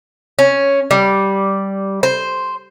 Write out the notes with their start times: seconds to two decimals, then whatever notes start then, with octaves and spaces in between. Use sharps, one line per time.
0.39 C#4
0.91 G3
2.03 C5